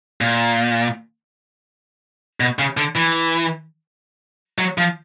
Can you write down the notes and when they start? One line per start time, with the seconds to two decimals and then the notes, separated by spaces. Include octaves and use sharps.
0.21 A#2
2.40 B2
2.59 C#3
2.77 D3
2.96 E3
4.58 F#3
4.78 F3